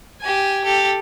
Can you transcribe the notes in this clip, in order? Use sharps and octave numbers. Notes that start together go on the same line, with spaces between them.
G4 G#5
G4 A4